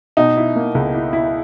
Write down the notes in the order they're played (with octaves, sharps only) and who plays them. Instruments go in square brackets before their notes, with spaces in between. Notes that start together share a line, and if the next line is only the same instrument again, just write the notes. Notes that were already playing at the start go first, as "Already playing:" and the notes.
[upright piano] B2 [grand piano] D#4
[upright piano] E4
A#3
C#2
E4
E4